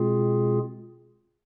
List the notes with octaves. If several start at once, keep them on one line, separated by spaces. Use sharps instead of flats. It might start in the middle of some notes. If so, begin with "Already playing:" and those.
Already playing: B2 G#3 C4 F4 G#4